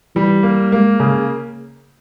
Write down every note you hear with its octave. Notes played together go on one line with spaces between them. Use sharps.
E3 G3
A#3
G#3 A#3
C#3